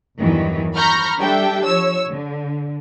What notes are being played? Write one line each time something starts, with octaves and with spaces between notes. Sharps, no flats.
E2 G2 D#3 E3 F#3
A#5 B5 C#6 F6 G6 A#6
G3 D4 G4 A4 E5 G5
F3 C#5 E6
D3